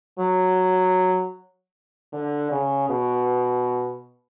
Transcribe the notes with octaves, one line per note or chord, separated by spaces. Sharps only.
F#3
D3
C#3
B2